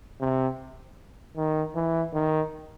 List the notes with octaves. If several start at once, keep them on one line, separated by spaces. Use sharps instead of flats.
C3
D#3
E3
D#3